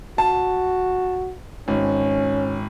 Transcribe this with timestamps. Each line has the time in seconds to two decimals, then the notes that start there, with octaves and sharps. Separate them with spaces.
0.18 F#4 A5
1.68 G#1 C#4